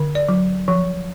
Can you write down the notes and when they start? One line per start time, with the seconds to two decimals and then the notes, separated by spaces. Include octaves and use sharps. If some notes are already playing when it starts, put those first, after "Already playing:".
Already playing: D3
0.15 D5
0.28 F#3
0.68 F3